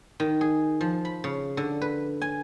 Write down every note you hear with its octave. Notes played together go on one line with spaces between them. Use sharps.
D#3
G#4
F3
B5
C#3
D3
B4
G#5